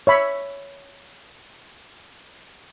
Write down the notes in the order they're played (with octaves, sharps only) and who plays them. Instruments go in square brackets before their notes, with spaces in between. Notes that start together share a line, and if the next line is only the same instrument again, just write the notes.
[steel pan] C#5 E5 B5